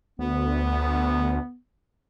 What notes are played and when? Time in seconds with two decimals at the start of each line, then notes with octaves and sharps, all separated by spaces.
0.19 D2 B3